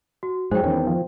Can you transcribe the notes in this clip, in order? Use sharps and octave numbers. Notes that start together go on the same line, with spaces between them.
F#4
G#2 F#3 G#4 C5 G5
E2 D#3 C#4
F3